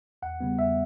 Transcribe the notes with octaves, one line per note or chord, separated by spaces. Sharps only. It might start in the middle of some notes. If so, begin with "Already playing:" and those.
E2 F#5
C#3 G3 B3
E2 E5